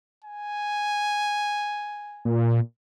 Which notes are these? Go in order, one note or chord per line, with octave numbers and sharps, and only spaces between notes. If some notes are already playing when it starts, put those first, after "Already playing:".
G#5
A#2